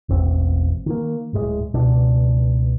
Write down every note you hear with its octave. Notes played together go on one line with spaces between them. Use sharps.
E1 A1 C4
D#3 A#3
D1 A2 G#3
C#2 B2 D4